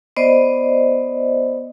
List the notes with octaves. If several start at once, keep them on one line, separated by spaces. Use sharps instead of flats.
B3 C5 D5 D#5